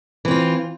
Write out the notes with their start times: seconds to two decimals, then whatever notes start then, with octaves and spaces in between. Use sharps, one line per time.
0.25 E3
0.28 C4
0.31 F4